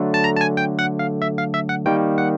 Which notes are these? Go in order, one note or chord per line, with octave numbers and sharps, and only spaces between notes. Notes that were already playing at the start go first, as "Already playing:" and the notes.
Already playing: D3 F#3 A3
A5
A#5
A5
G#5
G5
F#5
F5
E5
F5
E5
F#5
D#3 G3 A#3 G5
F#5